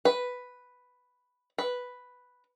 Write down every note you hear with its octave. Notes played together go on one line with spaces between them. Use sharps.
B4
B4